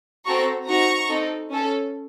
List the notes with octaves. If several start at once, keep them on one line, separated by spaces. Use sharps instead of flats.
C4 F#4 A4 A#5 C#6
C4 D#4 F#4 A#5 C#6
C4 D#4 A4
C#4 A4